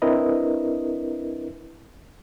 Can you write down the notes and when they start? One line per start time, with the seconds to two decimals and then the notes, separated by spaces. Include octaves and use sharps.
0.02 C4 D4 E4 A#4 B4 D#5